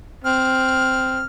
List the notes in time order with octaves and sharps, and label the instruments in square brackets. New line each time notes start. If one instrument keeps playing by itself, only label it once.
[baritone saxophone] C4 [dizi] F6